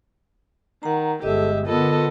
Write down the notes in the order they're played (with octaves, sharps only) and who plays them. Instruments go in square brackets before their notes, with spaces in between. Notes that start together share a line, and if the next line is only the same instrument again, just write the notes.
[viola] D#3 [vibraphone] F#5 A#5
[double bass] G1 G#3 [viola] G4 E5 [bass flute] A4 [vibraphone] D#5
[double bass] D3 B3 [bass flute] F4 [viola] A4 D#5 [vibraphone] A#4